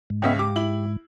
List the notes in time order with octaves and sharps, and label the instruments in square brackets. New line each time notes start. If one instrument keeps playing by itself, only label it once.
[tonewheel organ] G#2
[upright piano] C#2 C#4 E5 [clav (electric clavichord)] B3 D#5 G5
[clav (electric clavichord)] G4 [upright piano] D6
[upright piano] E4 F#7